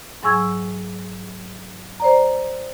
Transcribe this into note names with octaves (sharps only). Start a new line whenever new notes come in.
G#2 F#3 G#5 C#6 E6 G#6
C5 D5 A#5